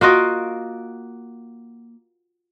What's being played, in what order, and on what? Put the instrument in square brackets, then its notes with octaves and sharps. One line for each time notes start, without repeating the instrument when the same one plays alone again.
[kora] A#3 F4 F#4 D#5